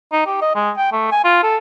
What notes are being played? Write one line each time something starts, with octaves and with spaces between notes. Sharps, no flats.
D#4
G4
D#5
G#3
G5
A3
G#5
F4
A4